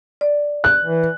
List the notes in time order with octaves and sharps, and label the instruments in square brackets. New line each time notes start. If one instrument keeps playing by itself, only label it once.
[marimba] D5
[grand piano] F#6
[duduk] E3